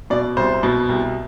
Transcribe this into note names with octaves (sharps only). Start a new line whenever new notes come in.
B2 D5
C2 C5
B2
C2